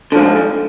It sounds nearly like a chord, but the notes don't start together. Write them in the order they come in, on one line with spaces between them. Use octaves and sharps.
D3 F3 G#2